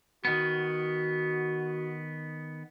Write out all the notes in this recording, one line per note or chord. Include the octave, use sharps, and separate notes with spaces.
D#3 B3 F#4